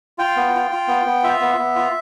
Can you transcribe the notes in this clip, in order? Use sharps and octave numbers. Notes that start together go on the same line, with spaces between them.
F4 G5
B3
F4
F4
B3
B3
F4 E5
B3
B3
F4